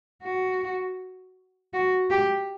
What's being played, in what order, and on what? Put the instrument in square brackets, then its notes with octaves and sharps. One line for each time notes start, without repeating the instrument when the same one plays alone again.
[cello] F#4
F#4
G4